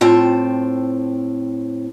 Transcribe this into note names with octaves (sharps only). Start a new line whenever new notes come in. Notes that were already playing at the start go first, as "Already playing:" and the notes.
A2 C4 F4 G5 A5